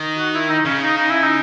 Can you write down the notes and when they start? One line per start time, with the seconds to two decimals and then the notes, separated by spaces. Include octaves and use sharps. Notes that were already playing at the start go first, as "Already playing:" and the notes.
Already playing: D#3
0.18 F#4
0.34 E4
0.49 D#4
0.65 C#3 C#4
0.82 D#4
0.98 D#4
1.10 E4
1.23 D#4